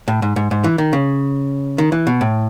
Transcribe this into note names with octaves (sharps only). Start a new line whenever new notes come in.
A2
G#2
G#2
G#2
E3
D#3
C#3
D#3
E3
B2
A2